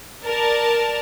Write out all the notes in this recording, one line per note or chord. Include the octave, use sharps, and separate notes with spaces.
A#4 D5 A5